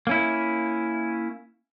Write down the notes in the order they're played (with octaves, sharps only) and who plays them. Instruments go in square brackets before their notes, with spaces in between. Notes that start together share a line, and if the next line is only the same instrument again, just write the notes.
[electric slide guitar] A#3 C#4 E4